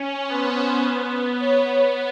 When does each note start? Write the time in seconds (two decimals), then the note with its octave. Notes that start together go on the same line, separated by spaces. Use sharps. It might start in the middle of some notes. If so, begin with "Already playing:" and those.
Already playing: C#4
0.29 B3 C5
0.86 B3
1.40 B3 C#5